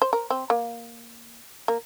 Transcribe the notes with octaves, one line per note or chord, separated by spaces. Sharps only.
C5
A#4
C4
A#3
A#3